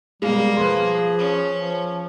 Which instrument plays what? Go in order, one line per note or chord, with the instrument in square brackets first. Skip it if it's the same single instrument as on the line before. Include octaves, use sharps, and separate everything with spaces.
[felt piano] B2 G#3 [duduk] G3 [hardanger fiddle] A#3
[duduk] F3 [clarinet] G#4 [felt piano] B4 C6
[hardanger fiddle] C#4
[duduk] F3